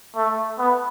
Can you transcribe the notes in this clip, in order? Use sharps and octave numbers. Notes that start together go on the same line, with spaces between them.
A3
B3